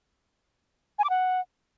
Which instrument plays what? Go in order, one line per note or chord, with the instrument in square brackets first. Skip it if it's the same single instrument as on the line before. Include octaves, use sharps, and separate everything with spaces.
[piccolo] G#5
D6
F#5